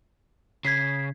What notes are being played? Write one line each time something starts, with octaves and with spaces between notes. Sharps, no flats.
C#3 G#6 B6 C7